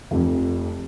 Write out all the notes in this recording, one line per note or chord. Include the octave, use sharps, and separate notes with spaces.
F1 F2